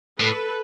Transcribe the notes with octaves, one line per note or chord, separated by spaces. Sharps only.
A2 A4 B4